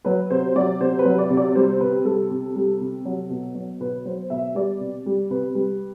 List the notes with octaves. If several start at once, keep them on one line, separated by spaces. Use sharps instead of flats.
F#3 B4
C3 C5
F#3 D5
C3 C5
B4
F#3
D5
C3
D5
G3 C5
C3 B4
G3 A4
C3
G3
C3
F#3
B2
F#3
B2 B4
F#3 C5
B2 E5
G3 D5
C3
G3
C3 B4
G3